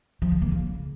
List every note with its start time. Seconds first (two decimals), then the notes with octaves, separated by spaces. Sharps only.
0.22 F3
0.32 D3
0.42 A#3
0.52 C#3